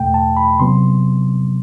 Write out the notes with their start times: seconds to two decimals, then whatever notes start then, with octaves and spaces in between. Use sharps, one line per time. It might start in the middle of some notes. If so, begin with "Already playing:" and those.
Already playing: E2 B2 A3 G5
0.14 A5
0.37 B5
0.60 C3 F#3 B3 C6